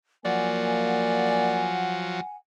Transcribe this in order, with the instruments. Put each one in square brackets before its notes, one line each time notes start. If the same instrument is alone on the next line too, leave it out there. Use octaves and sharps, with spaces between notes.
[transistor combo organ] F3 F#3 [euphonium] A#3 [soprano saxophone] D5 [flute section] F#5 G#5